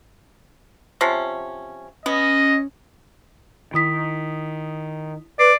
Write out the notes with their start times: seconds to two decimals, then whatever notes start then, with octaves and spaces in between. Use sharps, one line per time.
1.01 C3 F3 C#4
2.06 B3 C#4 D#5
3.74 D#3 E4 D#6 B6
5.39 B4 D5 C7